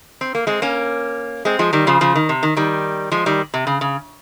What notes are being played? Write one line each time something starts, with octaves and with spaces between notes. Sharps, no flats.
C4
A#3
G#3 C4
A#3 C#4
G#3 C4
F3 G#3
D#3 G3
C#3 F3
C#3 F3
D#3
C3
D#3
D#3 G3
F3 G#3
D#3 G3
C3
C#3
C#3